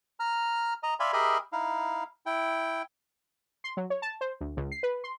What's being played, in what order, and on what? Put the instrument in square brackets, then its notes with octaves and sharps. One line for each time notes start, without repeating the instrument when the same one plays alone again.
[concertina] A#5 F6
D#5 A#5
D5 E5 F5 G#5 B5 C6
G4 G#4 A#4 D#5 E5 B5
D#4 E4 F5
E4 G5
[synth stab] C6
F#3
C#5
A5
C5
D2
C#2
C7
B4
C6